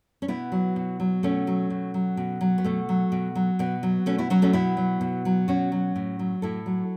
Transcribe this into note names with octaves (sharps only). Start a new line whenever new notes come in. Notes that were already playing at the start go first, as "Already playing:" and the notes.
C#4
B2 B3 E4
F#3
B2
F#3
B2 A3 C#4
F#3
B2
F#3
B2
F#3
B3
B2 A3
F#3
B2
F#3
B2 B3
F#3
B2 A3 C#4
B3 E4
F#3 C#4 F#4
A3 C#4
B2 B3 E4
F#3
B2
F#3
B2 C#4 F#4
F#3
A2
F#3
A2 E4 A4
F#3